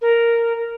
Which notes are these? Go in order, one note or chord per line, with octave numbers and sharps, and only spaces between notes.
A#4